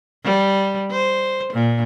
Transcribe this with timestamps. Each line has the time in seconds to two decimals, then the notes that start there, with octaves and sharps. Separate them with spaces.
0.24 G3
0.91 C5
1.53 A#2